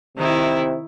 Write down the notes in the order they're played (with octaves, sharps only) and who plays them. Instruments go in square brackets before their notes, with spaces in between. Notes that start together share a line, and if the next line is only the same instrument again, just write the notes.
[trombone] C3 [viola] D#3 E4